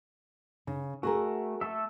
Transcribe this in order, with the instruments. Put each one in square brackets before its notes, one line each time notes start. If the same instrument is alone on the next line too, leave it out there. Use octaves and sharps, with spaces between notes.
[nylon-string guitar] C#3
[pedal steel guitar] A3 [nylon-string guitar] F#4 G#4 A#4
[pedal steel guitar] A3 A4 E5